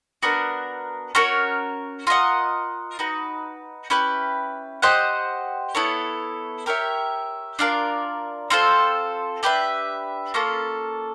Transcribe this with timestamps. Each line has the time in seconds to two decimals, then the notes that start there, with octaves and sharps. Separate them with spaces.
0.23 B3 D4 F#4 A#4
1.15 C#4 F#4 A#4 C#5
2.07 F4 A#4 D#5 F#5
2.99 D#4 F#4 B4
3.90 C#4 E4 G4 B4
4.82 G4 C5 D#5 F#5
5.75 B3 E4 A4 C#5
6.66 G4 A#4 C#5 E5
7.59 D4 F4 A#4 D5
8.50 C4 F4 A4 C5
9.43 D4 G4 B4 E5
10.34 A#3 C#4 F4 A4